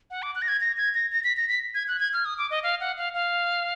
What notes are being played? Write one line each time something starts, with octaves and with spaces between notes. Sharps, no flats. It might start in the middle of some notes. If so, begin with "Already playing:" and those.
F#5
D6
F#6
A#6
G#6
A#6
G#6
A#6
A#6
B6
A#6
B6
G#6
F#6
G#6
F6
D#6
D6
D#5
F5
F#5
F5
F5